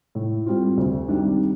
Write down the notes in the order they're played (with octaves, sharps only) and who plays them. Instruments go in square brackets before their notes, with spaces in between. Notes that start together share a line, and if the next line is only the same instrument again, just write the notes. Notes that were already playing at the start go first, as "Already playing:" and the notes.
[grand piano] A2
G3 C4 F4
D2
C3 D#3 G3 D4